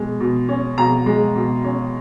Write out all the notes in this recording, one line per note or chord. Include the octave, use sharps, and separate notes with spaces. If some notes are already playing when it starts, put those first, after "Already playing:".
Already playing: B2 G#3
B2
C#4
B2 A#5
G#3
B2
C#4